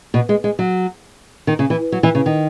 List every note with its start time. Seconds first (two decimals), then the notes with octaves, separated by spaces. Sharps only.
0.14 B2
0.29 G#3
0.44 G#3
0.59 F#3
1.47 D#3
1.59 C#3
1.70 E3
1.92 F#3
2.03 E3
2.15 C#3
2.26 D#3